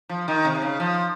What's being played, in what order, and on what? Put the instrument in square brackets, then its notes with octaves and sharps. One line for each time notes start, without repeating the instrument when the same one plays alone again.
[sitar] F3
D#3
C3
C#3
F3